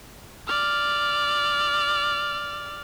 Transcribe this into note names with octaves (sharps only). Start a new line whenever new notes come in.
D5 F6